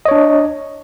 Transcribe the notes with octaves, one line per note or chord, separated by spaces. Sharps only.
D4 C#5 D#5